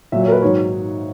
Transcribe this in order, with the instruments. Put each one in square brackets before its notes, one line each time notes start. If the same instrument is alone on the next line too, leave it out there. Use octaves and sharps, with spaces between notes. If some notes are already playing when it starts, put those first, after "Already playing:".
[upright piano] A#2 F#3 E5
C#5
A#4
B4
G#2 D#3 F#3 C#5